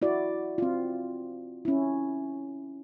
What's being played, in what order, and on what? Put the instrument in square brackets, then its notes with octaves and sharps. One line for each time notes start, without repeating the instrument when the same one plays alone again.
[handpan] E4 F#4 D5
C4 F4
C#4 E4